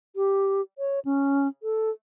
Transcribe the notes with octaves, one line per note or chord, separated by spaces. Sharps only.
G4
C#5
C#4
A4